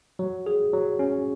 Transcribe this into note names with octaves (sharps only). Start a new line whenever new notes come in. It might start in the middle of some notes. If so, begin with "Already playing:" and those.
F#3
G#4
F#3
C#4